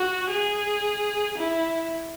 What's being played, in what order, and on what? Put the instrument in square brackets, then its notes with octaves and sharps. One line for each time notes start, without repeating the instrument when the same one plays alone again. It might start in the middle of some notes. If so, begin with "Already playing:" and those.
Already playing: [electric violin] F#4
G#4
E4